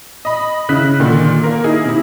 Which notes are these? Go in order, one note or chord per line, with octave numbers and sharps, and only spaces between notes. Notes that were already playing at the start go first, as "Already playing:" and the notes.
D#5 B5
C#3 E4 F#6 B6
A#2 D3 D#3
A#3 A#4
D#4 E4 G#4
C3 E4